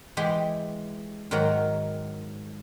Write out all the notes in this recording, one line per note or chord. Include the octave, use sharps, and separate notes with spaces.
E3 G#3 G4 G5
G#2 D#3 F#3 A#4 F#5